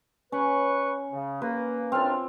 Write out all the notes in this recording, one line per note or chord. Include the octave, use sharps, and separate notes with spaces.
C#4 B4 C#6
C#3
A#3 B4
F#2 C4 D4 F4 F6